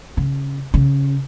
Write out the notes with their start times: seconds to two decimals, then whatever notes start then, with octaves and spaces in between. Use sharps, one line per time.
0.17 C#3
0.74 C#3